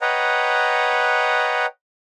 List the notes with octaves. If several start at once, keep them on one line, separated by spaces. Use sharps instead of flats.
B4 C#5 D#5 F#5 G5 A#5